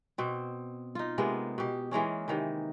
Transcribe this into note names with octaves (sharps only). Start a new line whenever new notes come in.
B2 C4
D#4 F4
C3 G#3 A#3 B3
B2 G4
E3 G#3 A#3 C#4
C3 D#3 E3